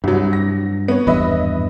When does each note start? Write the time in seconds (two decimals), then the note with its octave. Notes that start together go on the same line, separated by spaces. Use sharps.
0.04 C2 G2 F#3
0.33 A#6
0.88 B3 C#5
1.07 G#1 E2 G2 B4 D#5 E5